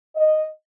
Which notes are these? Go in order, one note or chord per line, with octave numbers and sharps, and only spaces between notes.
D#5